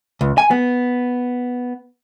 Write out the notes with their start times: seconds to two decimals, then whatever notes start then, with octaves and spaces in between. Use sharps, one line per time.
0.21 C#2
0.38 G#5
0.51 B3